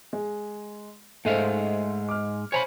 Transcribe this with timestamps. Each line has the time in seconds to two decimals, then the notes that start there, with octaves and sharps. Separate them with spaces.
0.13 G#3
1.25 G#2 G#3 A3 C5 F5
2.09 D6 F6
2.52 C5 C#5 G#5 A#5 B5